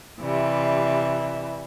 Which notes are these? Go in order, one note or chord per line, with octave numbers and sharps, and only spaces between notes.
C3 E3 G3 E5